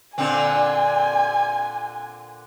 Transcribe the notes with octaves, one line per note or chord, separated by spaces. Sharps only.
A#2 D3 C4 G#5